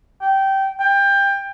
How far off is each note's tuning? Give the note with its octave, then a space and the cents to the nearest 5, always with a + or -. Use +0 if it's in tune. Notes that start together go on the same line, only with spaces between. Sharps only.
G5 -15
G5 +20